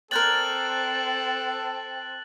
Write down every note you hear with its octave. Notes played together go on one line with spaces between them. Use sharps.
C4 A4 A#4 C5 D5 F#6 A6 F#7